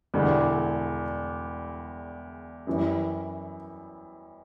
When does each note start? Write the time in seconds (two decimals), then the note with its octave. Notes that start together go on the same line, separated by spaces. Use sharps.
0.14 E1 E2 D3 G3
2.67 F#2 E3 G3